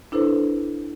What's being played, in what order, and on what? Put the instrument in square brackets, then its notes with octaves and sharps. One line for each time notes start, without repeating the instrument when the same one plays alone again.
[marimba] D4 E4 A4 B4 C5